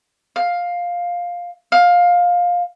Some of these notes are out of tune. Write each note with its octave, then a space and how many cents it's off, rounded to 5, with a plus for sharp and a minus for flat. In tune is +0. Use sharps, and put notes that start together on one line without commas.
F5 +10
F5 +15